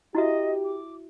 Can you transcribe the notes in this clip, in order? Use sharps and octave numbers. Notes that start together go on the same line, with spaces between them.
E4 F#4 G4 D#5 E5
D6